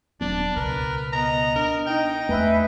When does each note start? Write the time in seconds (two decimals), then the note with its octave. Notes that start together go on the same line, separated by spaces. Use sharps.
0.21 D#1 F#3 B3 D4
0.56 C#2 B2 A#4 B4
1.13 B3 D#5 A#5
1.55 D4 A#4
1.86 D#4 G5
2.29 E2 A3 B4 E5 G#5